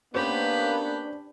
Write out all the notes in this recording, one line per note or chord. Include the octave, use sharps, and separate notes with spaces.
A#3 B3 C#4 D4 G4 B4 C5 B5